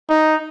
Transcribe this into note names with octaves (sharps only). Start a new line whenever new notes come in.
D#4